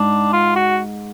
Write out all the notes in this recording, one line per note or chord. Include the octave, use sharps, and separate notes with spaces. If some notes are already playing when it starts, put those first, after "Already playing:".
Already playing: G#2 D4
F4
F#4